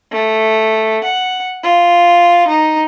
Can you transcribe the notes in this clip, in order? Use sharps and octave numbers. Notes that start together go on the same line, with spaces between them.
A3
F#5
F4
D#4